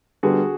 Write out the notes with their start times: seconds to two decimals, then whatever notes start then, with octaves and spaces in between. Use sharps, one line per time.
0.23 D3 G3 B3 F#4 G#4